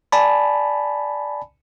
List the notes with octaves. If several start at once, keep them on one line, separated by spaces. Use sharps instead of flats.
D5 G#5 A5 B5